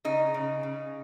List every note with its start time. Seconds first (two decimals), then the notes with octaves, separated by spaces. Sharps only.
0.05 C#3 D#4
0.34 C#3
0.63 C#3